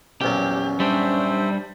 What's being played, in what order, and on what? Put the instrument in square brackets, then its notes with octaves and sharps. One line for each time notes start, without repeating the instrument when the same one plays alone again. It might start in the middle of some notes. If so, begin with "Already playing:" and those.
[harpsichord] A#1 E2 F#3 [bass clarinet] C#4 [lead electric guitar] G4
[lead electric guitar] G3 D4 [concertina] C5 E5